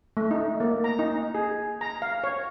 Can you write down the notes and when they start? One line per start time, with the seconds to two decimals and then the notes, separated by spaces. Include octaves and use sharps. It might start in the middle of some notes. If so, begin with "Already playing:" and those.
0.17 A3
0.31 D#4
0.60 A#3
0.84 A#5
0.99 D#4
1.35 G#4
1.81 A#5
2.02 F5
2.24 C#5